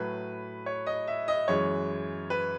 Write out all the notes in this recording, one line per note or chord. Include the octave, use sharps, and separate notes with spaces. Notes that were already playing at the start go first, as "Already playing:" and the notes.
Already playing: A2 F#3 B4
C#5
D#5
E5
D#5
F#2 E3 G#3 C#5
B4